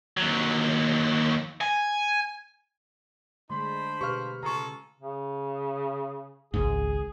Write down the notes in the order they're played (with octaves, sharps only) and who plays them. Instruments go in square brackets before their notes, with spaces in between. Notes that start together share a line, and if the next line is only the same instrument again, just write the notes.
[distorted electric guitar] D#2 F#3
G#5
[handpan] D3 G#3 A3 [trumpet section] D4 C5 B5 [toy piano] C6
[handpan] B2 [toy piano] G4 B4 F5 [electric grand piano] C#6 F6
[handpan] C#3 C#4 [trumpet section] F4 G#4 A4 [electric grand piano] A#5 C#6
[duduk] C#3
[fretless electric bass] G#1 C#2 G#2 [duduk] G#4